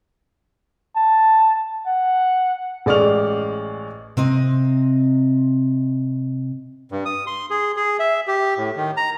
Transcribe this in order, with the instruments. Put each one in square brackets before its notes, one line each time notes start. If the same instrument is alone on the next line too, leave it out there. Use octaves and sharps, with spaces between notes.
[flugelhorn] A5
F#5
[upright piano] A1 G#3 D5 C#6 F6 F7
[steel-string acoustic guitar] C3 C4 D#5
[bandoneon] G2
D#6
C6
G#4
G#4
E5
G4
A2
D#3
A#5